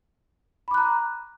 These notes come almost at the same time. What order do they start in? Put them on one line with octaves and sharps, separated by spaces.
B5 D6 F#6 A#5